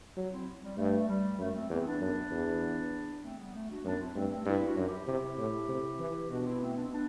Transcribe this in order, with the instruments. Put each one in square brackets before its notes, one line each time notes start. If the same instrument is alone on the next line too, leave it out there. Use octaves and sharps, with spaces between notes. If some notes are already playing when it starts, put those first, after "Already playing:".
[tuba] F#3
[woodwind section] C4 E4
G3
[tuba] G2 [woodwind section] A3
[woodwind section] G3
[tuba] F#2 [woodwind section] A3
[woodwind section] A3 C4
[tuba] E2 [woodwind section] A3 C4
[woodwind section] B3 D4
[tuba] F#2 [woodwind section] B3 D4
[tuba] E2
[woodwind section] A3 C4
G3 B3
A3
D4 F#4
[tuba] F#2 [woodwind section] B3 D4
[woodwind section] C4 E4
[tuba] G2 [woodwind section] A3 C4
[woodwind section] A3 C4
[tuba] G2 [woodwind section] C4 E4
[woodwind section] D4 F#4
[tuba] F#2
[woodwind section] E4 G4
[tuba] C3 [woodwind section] E4 G4
[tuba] A2
C3
E3
[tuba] B2 [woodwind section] D4 F#4
[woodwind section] C4 E4
A3 C4
B3 D4
C4
B3 D4